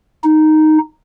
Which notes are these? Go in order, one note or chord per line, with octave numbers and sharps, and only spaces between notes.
D#4